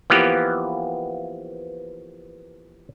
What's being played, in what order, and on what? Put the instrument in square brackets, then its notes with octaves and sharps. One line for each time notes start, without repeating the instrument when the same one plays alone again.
[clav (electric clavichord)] E3 F3 A#3 B3 G4